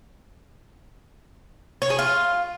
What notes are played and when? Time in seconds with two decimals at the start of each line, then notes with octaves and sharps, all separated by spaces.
1.82 C#5
1.90 G#4
1.99 F4